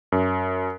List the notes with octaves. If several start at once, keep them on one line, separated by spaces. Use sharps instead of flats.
F#2